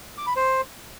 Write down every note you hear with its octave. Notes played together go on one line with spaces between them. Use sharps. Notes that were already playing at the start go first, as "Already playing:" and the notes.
D6
B5
C5